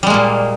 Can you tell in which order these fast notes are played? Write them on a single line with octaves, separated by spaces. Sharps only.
G3 G#3 A#3 A#2